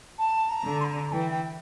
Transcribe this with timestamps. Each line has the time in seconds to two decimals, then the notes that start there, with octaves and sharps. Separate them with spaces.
0.18 A5
0.49 A#5
0.65 D3
0.80 C6
0.84 A#5
1.12 E3 G5
1.31 G5
1.43 G5